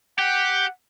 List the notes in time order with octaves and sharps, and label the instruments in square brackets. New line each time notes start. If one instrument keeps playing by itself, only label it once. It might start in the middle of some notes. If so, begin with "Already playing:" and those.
[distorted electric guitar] G4 [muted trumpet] F#5